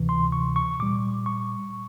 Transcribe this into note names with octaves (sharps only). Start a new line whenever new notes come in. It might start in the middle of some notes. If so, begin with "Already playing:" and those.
Already playing: D2 C3 E3
C6
C#6
C#6
A#2 G3 D6
C#6